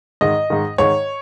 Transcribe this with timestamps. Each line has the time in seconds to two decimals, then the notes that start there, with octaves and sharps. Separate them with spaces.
0.21 G#2 D#3 D#5
0.50 G#2 D#3
0.78 G#2 D#3 C#5